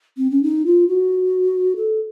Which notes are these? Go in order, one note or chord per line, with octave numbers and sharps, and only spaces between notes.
C4
C#4
D#4
F4
F#4
A4